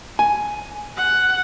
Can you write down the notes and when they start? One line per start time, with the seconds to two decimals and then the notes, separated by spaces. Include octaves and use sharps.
0.19 G#5
0.97 F#5